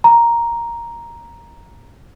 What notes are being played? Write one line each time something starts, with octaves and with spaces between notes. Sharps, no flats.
A#5